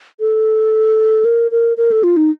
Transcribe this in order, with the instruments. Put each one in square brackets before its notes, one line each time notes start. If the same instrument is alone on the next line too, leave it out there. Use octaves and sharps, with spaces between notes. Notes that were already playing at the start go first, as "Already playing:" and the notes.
[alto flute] A4
A#4
A#4
A#4
A4
F4
D#4